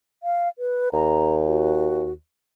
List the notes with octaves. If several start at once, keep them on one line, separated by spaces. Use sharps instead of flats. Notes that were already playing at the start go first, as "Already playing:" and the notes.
F5
B4
D#2 A#5
F#4